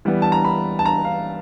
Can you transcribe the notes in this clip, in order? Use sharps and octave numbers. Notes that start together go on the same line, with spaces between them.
E3 G3 B3
A5
A#5
B5
A5
A#5
F5